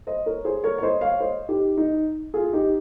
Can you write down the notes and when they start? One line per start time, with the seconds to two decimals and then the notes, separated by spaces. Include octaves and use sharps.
0.07 C5 D#5
0.26 A#4 C#5
0.45 G#4 C5
0.64 A#4 C#5
0.78 C#5
0.83 C5 D#5
1.01 C#5 F5
1.20 C5 D#5
1.49 D#4 G4
1.77 D#4
2.34 F4 G#4
2.53 D#4 G4